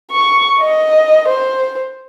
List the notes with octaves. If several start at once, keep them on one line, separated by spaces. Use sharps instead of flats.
C#6
D#5
C5